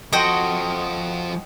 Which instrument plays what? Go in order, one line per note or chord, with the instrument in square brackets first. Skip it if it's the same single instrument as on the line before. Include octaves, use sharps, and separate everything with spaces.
[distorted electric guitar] F3 A4 [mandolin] F#4 D#5 G5 [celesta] C6 D#6 C#7